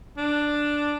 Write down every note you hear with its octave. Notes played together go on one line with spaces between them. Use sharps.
D4